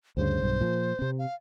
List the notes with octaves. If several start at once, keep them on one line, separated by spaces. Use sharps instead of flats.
D2 G2 C#3 C5
B1 G2
A#2 F3
C3 C4
F5